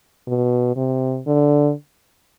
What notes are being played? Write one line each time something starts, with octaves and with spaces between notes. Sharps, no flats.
B2
C3
D3